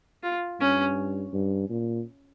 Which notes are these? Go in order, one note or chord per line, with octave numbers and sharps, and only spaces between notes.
F4
G2 C#4
G2
A#2